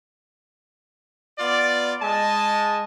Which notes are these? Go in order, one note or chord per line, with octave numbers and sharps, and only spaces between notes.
B3 F4 D5
G#3 D#5 G#5 A5